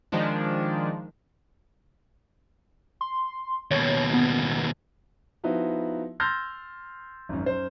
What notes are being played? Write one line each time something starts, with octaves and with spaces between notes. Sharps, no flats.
D#3 F3 G#3 D4
C6
D#2 B2 C#5
B3
F3 B3 D#4 E4 F#4
C6 E6 F6 G6 A6 A#6
G#1 F#2
F#2 C5